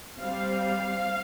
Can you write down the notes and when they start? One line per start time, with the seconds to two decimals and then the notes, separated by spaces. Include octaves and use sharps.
0.18 G3 C4 F5